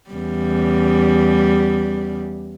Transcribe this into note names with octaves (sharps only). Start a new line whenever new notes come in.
E2 C#3 G3